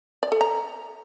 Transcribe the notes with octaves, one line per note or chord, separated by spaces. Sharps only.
D5
A4
A#5